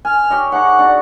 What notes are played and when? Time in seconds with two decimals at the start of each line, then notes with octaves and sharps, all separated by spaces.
0.05 G#5 F6
0.30 G4 C#5 D#5
0.52 D#4 G#4 C#5 F#5
0.79 D4 F#4